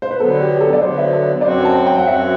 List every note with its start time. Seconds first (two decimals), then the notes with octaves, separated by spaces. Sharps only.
0.02 C5
0.11 B4
0.19 D3 F#3 B3 A4
0.40 G4
0.61 A4
0.73 D5
0.82 D3 F#3 B3 C5
0.98 E5
1.13 A4
1.41 D5
1.45 F#2 F#3 C4 F#4 C5
1.65 A5
1.87 G5
1.98 F#5
2.07 F#2 F#3 C4 F#4 E5